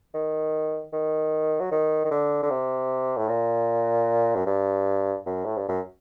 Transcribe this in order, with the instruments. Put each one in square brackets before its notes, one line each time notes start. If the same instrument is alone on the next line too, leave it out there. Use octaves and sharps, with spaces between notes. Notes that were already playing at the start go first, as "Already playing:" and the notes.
[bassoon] D#3
D#3
F#3
D#3
D#3
D3
D3
C3
A2
A#2
F#2
G2
F#2
A2
G2
F#2